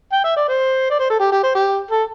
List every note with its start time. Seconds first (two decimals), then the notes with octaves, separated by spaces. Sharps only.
0.12 G5
0.24 E5
0.36 D5
0.48 C5
0.90 D5
0.99 C5
1.10 A4
1.20 G4
1.32 G4
1.43 C5
1.55 G4
1.91 A4